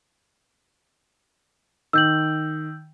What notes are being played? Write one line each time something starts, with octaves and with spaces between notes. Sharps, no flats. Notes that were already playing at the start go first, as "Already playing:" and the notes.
D#3 E6 G6 F#7